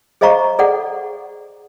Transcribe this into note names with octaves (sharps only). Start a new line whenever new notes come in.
G#4 C5 D#5 F5 A#5 C#6
G#4 A4 D5 F#5